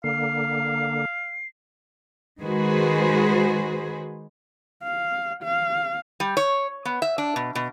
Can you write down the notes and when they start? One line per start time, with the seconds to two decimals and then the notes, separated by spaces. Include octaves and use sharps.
0.04 D3 A#3 F5 C7
2.41 D#3 G#3 F#4 G#4 B4 C5
4.83 F5
5.43 F5
6.20 G3
6.37 C#5
6.85 B3
7.02 E5
7.18 D4
7.36 B2
7.55 B2